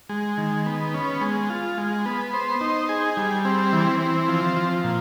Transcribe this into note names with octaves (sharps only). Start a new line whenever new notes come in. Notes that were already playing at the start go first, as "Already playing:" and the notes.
G#3
D#3
B3
C#4
G#3
F4
G#3
B3
C5
D#4
G#4
G3
C4
E3
C4
F3
F3
A#2